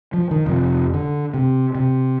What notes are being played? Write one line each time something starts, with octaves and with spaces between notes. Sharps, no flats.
F3
D#3
F1
D3
C3
C3